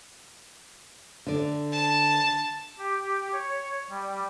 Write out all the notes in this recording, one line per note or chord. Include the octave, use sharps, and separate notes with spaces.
D3 D5
A5
G4
C#5
G3